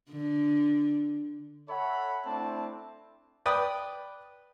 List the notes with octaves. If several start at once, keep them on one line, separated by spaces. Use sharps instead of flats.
D3
A4 C#5 E5 F#5 B5
A3 C4 D4 E4 A5
B4 D5 G5 D#6